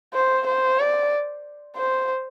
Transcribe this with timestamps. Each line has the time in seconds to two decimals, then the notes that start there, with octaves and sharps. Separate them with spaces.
0.14 C5
0.47 C5
0.80 D5
1.77 C5